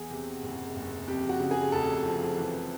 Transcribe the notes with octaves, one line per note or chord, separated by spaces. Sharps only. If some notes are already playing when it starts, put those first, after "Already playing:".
Already playing: E2 G#4
C3
F#1
F#1
F2 G4
F#4
C#3
G#4
F1 A4
F3
E3